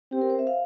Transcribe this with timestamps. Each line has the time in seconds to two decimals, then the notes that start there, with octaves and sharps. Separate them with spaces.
0.12 C4 G4
0.21 A#4
0.30 C5
0.39 E5
0.47 F5